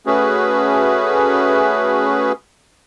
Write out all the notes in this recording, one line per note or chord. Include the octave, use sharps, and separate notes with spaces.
A3 C#4 F#4 G#4 B4